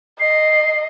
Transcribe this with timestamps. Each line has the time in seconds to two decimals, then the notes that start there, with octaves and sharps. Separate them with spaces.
0.20 D#5 C7